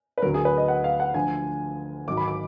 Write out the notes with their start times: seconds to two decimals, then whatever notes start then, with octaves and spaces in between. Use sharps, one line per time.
0.18 B4
0.22 D2 D3 F#3 A#4
0.34 G#4
0.45 B4
0.57 D#5
0.68 F#5
0.84 F5
1.00 F#5
1.14 D2 D3 F3 G#5
2.07 G#1 G#2 D#3 F#3 D6
2.17 B5
2.28 D6